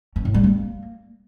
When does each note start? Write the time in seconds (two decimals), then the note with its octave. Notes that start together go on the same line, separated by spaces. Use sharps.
0.16 C#4
0.25 A2
0.34 G3
0.44 A#3